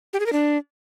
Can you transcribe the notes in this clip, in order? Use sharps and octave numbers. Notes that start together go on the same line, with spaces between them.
G4
G#4
A#4
D4